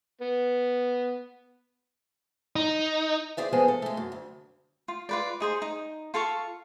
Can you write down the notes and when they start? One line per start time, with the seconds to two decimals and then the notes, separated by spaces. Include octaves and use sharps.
0.21 B3
2.56 D#4
3.37 C4 G#4 D5 E5
3.53 F3 G#3 B3 G#4 C5 D#5
3.68 A4
3.82 G#3 A3
3.97 F#2
4.12 D2
4.88 F4
5.09 F4 B4 D5
5.40 D#4 G#4 C5
5.62 D#4
6.14 F4 A4 F5 C#6